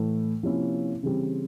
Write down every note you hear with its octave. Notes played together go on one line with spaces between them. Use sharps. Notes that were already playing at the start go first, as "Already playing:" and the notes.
Already playing: A2 E3 A3
C3 F3 A#3 C#4 E4
C#3 E3 G3 C4